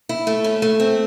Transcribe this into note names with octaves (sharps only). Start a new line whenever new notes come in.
E4
A3
C#4
A3
C4